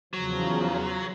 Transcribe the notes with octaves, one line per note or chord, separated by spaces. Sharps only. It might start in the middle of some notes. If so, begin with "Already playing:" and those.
E2 C#3 F3 F#3